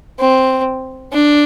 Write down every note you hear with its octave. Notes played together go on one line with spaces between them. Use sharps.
C4
D4